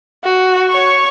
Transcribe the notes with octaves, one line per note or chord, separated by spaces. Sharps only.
F#4
C#5 C#6